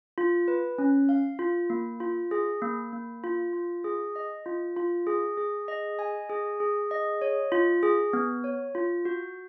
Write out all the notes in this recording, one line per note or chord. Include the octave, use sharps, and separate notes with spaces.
F4
B4
C#4
F5
F4
A#3
F4
G#4
A#3
A#3
F4
F4
G#4
D#5
F4
F4
G#4
G#4
D#5
G#5
G#4
G#4
D#5
C#5
F4
G#4
B3
C#5
F4
F#4